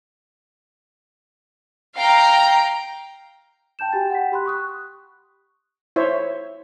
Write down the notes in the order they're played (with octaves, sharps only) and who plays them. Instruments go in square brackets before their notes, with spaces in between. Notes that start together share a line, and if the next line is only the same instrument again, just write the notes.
[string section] F5 G5 A#5
[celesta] G5 A5 G6 E7
F#4 G4 G5 G#5 A6
F#5 G5 B6
G4 B5 C6 F#6
C#6 D#6 F#6
[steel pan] E4 C5 C#5 E5